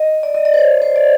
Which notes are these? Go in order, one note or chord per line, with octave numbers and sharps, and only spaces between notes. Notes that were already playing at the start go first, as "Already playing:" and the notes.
Already playing: D#5
D5
D#5
D5
C5
C#5
C5
D5